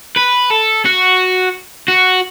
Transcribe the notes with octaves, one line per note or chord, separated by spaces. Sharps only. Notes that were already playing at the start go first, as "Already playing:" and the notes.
B4
A4
F#4
F#4